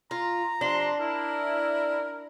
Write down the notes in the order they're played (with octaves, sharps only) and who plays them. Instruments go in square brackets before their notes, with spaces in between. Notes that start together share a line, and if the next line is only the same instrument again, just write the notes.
[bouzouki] F4 [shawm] A#5
[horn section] C3 F3 C6 [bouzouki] D4
[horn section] E4 [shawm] A#4